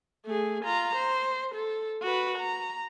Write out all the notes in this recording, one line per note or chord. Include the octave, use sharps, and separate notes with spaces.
A3 G#4
F4 A#5
C5
A4
F#4 B4
A#5